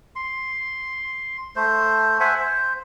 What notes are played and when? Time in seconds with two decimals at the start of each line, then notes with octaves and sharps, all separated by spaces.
0.16 C6
1.56 A3 C5
2.20 C5 E5 F#5 G#5
2.40 C5